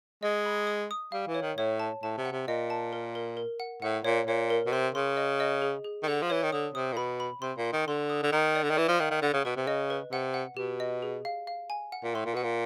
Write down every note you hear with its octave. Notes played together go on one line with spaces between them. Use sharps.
G#3 D#5
B5
D#6
D#6
G3 F5
E3
C#5
D#3
A2 C#5
A5
A2 A5
C3
F#5
C3
A#2 D#5
A5
A#4
A#4
A#4
F#5
A2 F#5
A#2 C#5
A#2 C#5
A#4
B2
C3 C6
C#3 C6
D#5
D#5
G#4
G#4
D#3
D3 F#5
F3
E3 C#5
D#3
D3 D#6
C3 D#6
A#2
B2 B5
B5
C3 C6
A#2
C6
D#3
D3 C6
D#6
D3
D#3 A#5
D5
D3
D#3
E3 D5
F3
D#3 F5
D#3
D3 F#5
C#3
B2 B4
C3
C#3 D#5
B4
C3 F#5
F#5
B2 G4
D#5
G#4
F5
F5
G#5
F#5
A#2
A2 C6
A#2
B2 F#5
A#2